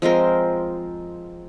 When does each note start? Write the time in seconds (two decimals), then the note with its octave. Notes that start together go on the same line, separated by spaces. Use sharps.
0.02 F3 G#3 C4 A#4